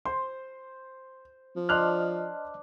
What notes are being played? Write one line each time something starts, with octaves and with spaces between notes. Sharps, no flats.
C5 C6
F3
D4 D#5 C6 F6 F#6 F7